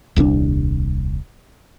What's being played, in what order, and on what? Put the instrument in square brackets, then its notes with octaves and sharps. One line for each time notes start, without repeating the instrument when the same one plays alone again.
[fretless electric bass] D#1 C2 C#3 D4